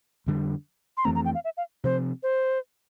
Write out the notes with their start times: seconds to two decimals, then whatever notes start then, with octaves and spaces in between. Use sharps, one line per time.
0.26 F2 D3 G3
0.97 C6
1.05 F2 E3 A3 C4 A#5
1.15 A#5
1.25 G5
1.35 F5
1.44 E5
1.57 F5
1.84 C3 F3 C4 C5
2.23 C5